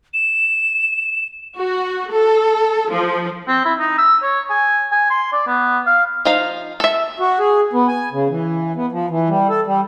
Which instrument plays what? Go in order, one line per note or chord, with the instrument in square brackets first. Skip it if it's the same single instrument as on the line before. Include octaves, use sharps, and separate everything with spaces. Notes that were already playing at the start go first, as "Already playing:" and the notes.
[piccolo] E7
[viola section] F#4
A4
F3
[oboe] C4
E4
D#4
E6
C#5
G#5
G#5
C6
D5
B3
F5
[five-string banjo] F3 D#4 F5
A4 E5
[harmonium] F#4
G#4
B3
G#5
C#3
E3
B3
F3
E3
G3
A4
G3